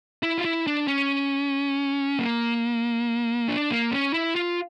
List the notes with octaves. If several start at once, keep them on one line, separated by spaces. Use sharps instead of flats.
E4
F4
E4
D4
C#4
A#3
D4
A#3
C#4
E4
F4